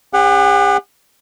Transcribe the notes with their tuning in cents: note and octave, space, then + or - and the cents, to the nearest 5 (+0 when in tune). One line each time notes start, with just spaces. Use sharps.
C#4 -30 G4 +45 F#5 +0